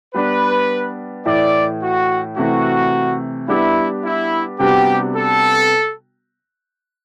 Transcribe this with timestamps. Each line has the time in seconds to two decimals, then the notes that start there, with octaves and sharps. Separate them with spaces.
0.14 G3 B3 D4 B4
1.26 A2 E3 A3 E4 D5
1.82 F#4
2.37 C3 E3 A3 F#4
3.48 G3 B3 D4 E4 G4
4.04 E4
4.59 C3 G3 B3 D4 F#4 G4
5.15 A4